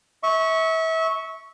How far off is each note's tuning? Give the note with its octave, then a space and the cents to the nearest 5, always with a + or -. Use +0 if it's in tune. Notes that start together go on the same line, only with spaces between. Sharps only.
E5 -30 C#6 +0